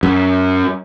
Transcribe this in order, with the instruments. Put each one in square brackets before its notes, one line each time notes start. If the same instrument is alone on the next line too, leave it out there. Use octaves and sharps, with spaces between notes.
[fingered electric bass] F#2